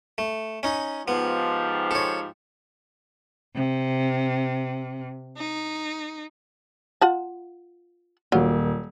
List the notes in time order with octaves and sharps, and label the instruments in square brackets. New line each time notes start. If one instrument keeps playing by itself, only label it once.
[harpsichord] A3
C#4 D#4
[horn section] G#2 F3 G4 [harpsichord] B3
[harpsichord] A4 C#5
[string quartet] C3
D#4
[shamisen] F4 F#5 A5
[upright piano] D#1 A#3 [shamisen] F#3 F4